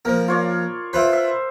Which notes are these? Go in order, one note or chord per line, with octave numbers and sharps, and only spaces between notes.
F3 A#3 A#4
F4 C#5 D5
E4 F4 B4 C5
E5